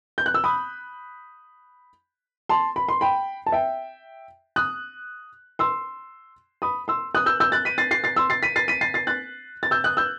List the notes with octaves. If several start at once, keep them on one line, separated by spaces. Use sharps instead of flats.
G6
F#6
E6
B5 D#6
A5 C6
B5
C6
G5 B5
A5
E5 G5
D#6 F#6
C6 E6
B5 D#6
C6 E6
D#6 F#6
E6 G6
E6 G6
F#6 A6
B6 D#7
A6 C7
A6 C7
A6 C7
C6 E6
A6 C7
B6 D#7
A6 C7
B6 D#7
A6 C7
A6 C7
F#6 A6
A6
E6 G6
D#6 F#6
E6 G6